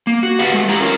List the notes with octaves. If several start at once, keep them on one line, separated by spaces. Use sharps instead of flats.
A#3
F#4
G4 B4 D#5 F5 F#5
G#3 A3
F4 G4 F#5 A#5
C#4 F4 A#4